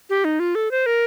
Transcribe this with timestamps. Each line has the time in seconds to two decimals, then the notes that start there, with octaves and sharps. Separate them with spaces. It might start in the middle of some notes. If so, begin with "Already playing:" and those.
0.10 G4
0.25 D#4
0.40 F4
0.55 A4
0.71 C5
0.86 A#4